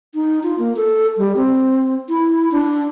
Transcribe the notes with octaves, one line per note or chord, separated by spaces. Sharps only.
D#4
F4
A#3
A4
G3
C4
E4
D4